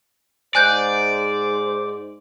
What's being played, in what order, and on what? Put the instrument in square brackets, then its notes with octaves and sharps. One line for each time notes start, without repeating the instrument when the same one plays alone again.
[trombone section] G#2 C5 [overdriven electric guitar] D5 [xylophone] G#5 F#6 G6